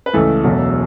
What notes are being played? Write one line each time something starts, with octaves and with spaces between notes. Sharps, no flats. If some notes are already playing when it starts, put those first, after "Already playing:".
B4
C#2 C#3 E3 A3 A4
E1 E2 B2 F#3 A3